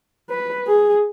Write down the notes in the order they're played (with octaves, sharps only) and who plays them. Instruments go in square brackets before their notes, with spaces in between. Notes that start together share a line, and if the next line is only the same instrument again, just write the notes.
[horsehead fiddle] B4
G#4